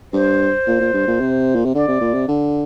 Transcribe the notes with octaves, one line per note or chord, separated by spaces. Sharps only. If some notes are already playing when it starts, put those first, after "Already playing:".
G2 C5
A#2
A#2
G2
A#2
C3
A#2
C3
D3 D5
C3
A#2
C3
D3